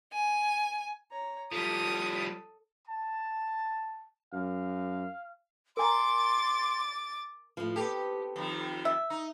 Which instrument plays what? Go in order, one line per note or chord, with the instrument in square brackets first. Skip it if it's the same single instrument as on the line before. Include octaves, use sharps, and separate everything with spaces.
[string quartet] G#5
[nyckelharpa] C#5 A#5
[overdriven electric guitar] F3 G3 [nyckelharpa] A4 A5 [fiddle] D#6
[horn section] A5
[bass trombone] F#2 [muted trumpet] F5
[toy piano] A#4 G#5 A#5 [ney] C6 [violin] D6 A6
[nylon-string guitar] A2 F3
[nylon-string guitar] B3 C4 A4 [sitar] G4
[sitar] F2 D#3
[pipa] E5
[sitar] D#4